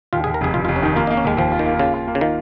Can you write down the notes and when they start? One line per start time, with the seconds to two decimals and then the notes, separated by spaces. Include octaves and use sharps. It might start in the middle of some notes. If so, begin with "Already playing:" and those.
0.13 D#2 F4
0.24 G#4
0.27 D#2
0.34 A#4
0.41 F1 G#4
0.54 F1 F4
0.65 F4
0.68 F1
0.76 C#4
0.83 D#3 D#4
0.96 A#3 F4
1.07 D#4
1.11 A#3
1.17 C#4
1.25 D#2 G#3
1.37 D#2 F3
1.52 F4
1.59 D#3
1.66 A#3
1.79 C#3 F4
1.94 F4
2.08 A#3
2.15 C#3
2.21 D#3 F4